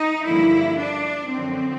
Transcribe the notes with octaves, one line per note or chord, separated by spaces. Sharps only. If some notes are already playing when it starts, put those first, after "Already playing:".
Already playing: D#4
G2 D3 F3 A#3 E4
D4
F#2 D3 F3 C4